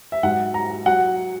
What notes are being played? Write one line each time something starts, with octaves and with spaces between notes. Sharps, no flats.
E5
G#2 F#3 F#5
A#5
F#3 F#5